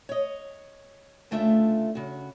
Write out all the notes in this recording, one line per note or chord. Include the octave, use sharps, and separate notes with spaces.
C#5 D#5
D2 C#3 A3 D4 F4 E5
C#3 F#4